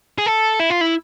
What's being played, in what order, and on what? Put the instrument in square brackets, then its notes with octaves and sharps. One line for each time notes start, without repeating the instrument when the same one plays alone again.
[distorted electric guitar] G#4
A4
E4
F4
E4